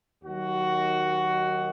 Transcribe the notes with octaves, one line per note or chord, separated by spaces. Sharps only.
D#2 D#3 F#3 F#4